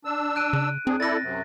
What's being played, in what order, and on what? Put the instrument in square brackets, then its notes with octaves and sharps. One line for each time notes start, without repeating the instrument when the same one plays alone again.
[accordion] D4 E6
[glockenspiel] F#6 D7 D#7
[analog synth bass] C#3
[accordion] F2 D4 G#4 [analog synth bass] C4
[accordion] E4 A4 D5 [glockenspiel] A6 A#6
[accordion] F#2 C3